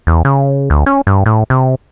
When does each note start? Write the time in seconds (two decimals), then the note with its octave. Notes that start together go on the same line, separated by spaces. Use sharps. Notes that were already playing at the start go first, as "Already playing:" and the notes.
0.07 E2
0.25 C#3
0.70 D2
0.86 C#4
1.07 G2
1.26 A2
1.50 C3